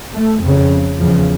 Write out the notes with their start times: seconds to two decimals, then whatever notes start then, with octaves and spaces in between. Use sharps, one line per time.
0.12 A3
0.41 F2 C#3
0.99 E2 C#3 F3